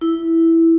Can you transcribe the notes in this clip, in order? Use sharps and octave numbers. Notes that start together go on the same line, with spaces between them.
E4